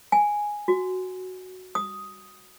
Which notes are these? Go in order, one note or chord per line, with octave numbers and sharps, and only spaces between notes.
G#5
F#4
D#6